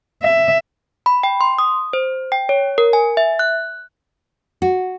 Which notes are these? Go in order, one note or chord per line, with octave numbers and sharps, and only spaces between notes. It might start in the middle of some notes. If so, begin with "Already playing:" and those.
E5
B5
G5
C6
D#6
C5
G5
C#5
A#4
G#5
E5
F#6
F#4